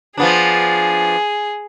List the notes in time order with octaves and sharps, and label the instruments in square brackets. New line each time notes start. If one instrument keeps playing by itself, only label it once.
[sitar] F3 B3 D4 [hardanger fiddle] G#4